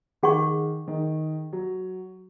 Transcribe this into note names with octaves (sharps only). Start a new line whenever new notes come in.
D#3 G#4 F#5 C#6
D#3
F#3